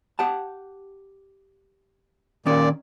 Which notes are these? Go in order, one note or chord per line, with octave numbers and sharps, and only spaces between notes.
G4 F#5 A5
A#2 D#3 C#4 D5